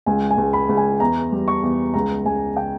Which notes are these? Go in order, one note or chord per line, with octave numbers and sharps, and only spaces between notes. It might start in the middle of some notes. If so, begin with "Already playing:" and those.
C#2 G#5
G#5
C#2
B5
C#2
G#5
E2 A#5
G3
C#6
E2
C#2 A#5
C#2 G#5
C#3 G5